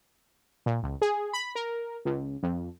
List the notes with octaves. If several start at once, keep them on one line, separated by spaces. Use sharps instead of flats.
A#2
C#2
G#4
B5
A#4
C#2
F2